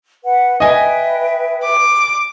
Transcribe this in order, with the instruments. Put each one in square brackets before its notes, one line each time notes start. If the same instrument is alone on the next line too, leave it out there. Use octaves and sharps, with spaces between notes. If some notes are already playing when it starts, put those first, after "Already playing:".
[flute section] B4 F#5
[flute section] B4 E5 G5 [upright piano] D#5 G#5
[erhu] D6